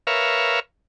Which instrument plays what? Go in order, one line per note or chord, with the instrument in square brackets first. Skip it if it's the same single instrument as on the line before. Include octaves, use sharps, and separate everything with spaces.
[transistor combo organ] A#4 B4 C#5 E5 F5